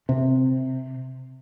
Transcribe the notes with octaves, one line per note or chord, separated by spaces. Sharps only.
C3